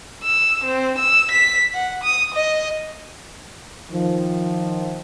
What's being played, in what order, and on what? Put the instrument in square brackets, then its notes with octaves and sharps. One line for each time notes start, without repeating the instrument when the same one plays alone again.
[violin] E6
C4
E6
B6
F#5
D#6
D#5
[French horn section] D#3 F3